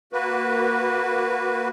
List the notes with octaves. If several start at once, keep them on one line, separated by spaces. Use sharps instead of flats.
A#3 F#4 B4